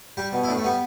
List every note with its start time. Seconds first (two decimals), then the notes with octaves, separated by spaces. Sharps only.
0.17 G3 G4
0.33 B2
0.43 E4
0.48 A2 D4
0.57 A3
0.64 G3 B3